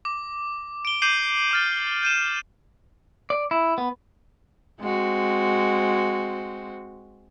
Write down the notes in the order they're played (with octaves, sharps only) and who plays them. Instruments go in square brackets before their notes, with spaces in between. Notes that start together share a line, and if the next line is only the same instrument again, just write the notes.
[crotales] D6
D7 G7
D6 G6 C7 D#7 F#7 G7
D6 F6 A6
G6 D#7 E7
[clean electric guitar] D5
E4
B3
[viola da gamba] G#3 C4 F#4